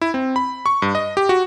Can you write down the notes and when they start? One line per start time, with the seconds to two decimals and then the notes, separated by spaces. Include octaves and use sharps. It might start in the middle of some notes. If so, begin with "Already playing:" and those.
0.02 E4
0.14 C4
0.36 B5
0.66 C#6
0.82 G2
0.95 D#5
1.17 G4
1.29 F#4